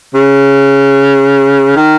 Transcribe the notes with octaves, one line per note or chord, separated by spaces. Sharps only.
C#3
D#3